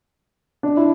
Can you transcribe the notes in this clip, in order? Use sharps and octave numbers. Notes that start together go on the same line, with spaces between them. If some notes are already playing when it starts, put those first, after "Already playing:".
D4
E4